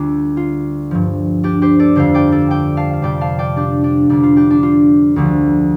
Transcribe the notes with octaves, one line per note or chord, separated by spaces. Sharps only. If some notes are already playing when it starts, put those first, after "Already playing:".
Already playing: D2 D3 G3 D4 F4
F4
G2 F3
D4 G4
G4 C5
A4 D5
F2 D3 G3 C5 F5
D5 G5
A4 D5
D5 G5
F5 A5
F5
F2 C3 G3 D5 G5
F5 A5
D5 G5
D4 G4
D4
F2 D3 G3 D4
F4
D4 G4
D4
F4
D2 D3 F3